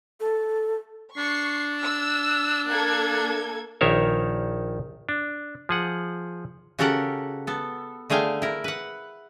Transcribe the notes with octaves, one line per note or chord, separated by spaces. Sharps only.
A4
D4 C#6 C7
E6
A#3 A4 G#6
A#1 D#3 A#4 C5 C#5 E5
D4
F3 G#4 F#5
C#3 F#4 G4 A4 A#4 F#5
B3 A4
D3 A3 G#4 F5 G5
E4 A#4
B4 F#5